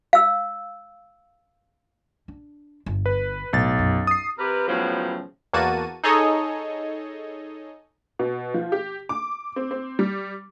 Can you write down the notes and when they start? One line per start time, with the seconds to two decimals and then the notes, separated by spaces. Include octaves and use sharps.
0.13 F5 E6
2.28 D4
2.86 G1
3.06 B4
3.53 B1 A2 A6
3.79 F#2
4.07 D#6 C7
4.38 C3 G4 A#4 B4
4.68 A2 C#3 F3 F#3 B3
5.53 E2 A#3 F#4 A5 D#7
6.04 D#4 G#4 A4 C#5 D#5
8.19 B2
8.54 F3
8.72 G4
9.09 D6
9.56 C4
9.71 C4
9.99 G3